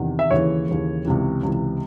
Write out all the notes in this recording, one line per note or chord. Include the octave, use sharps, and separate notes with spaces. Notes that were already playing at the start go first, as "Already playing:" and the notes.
Already playing: E2 C3 D#3
E5
D#2 C#3 E3 C#5
D#2 C#3 E3
C#2 C3 E3
C#2 C3 E3